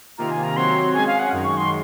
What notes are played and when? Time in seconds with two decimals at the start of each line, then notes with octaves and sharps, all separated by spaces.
0.18 C3 D#3 A#3 F4 A#5
0.31 G#5
0.43 A#5
0.57 F#3 C4 F#4 C#5 C6
0.94 G#3 C#4 G#4 G#5
1.07 F5
1.19 F#5
1.32 F#2 D#3 G#3
1.45 C#6
1.57 C6